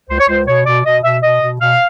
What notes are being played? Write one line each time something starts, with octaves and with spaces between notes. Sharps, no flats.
C#2 C5
C#5
C#2 C5
B2 C#5
B2 D5
B2 D#5
B2 E5
B2 D#5
B2
B2 F5